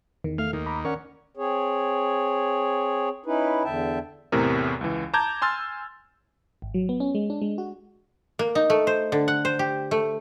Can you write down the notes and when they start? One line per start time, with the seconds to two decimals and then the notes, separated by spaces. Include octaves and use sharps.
0.24 E2 D#3
0.38 A3 F5
0.53 D#2 D#3
0.66 A#5 B5 D6
0.85 C#4 A#4 D5 F#5
1.37 C4 G#4 C#5
3.26 C#4 D#4 E4 B4
3.64 E2 D3 E5 G5 A5
4.32 E2 A2 C3 A#4
4.81 C#2 E3
5.14 A5 A#5 D6 G6 G#6
5.42 G#5 C6 E6 F6 A6
6.62 G#1
6.74 F#3
6.89 B3
7.00 C#4
7.15 G#3
7.30 D4
7.42 G#3
7.58 F#4
8.39 A#3
8.55 D#4
8.70 A3
8.87 C5
9.12 D3
9.28 F#5
9.45 C5
9.59 G4
9.91 A3